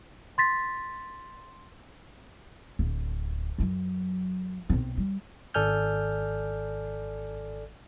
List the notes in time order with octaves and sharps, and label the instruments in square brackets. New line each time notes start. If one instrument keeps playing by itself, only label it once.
[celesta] C6 A6 B6
[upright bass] D1
F#2 F#3
B1 C4
G3
[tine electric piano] G#1 A4 D5 G#5 F6 G6